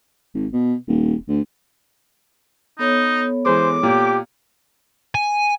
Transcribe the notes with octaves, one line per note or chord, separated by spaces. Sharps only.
G#1
B2
D#1
D2
B3 D#4 A4 C#5
E3 G#3 C5 D6
A#2 G4
G#5